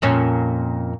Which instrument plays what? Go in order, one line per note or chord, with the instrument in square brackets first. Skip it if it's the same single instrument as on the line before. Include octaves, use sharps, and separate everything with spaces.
[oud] F2 A#2 C#4